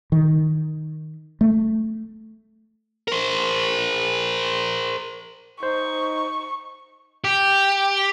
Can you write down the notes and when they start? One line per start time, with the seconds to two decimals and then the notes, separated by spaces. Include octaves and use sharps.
0.12 D#3
1.41 A3
3.08 A#4 C5
5.63 D#4 C5 C#6
7.24 G4